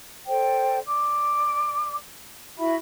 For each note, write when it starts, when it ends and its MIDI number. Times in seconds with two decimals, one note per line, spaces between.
0.27 0.78 69
0.27 0.78 72
0.27 0.78 74
0.27 0.78 79
0.85 1.95 74
0.85 1.95 86
2.58 2.74 64
2.58 2.74 66
2.58 2.74 76
2.58 2.74 83